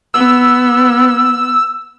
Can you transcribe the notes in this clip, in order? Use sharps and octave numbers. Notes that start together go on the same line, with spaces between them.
B3 E6